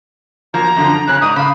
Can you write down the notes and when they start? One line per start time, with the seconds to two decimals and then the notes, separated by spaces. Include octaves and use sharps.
0.54 F3 F#3 A#3 A#5
0.76 F#2 D3 F3
1.07 C#3 C#4 F#6
1.21 G#2 D5 A#5 D#6
1.36 C#3 F5 B5